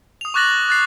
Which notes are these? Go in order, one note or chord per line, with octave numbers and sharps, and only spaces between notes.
D#6 F7
C#6 D6 F#6 A6 A#6 F#7
F#6 A6 C7